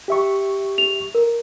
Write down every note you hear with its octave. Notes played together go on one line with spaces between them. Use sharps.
G4 E5 C#6
F7
A#4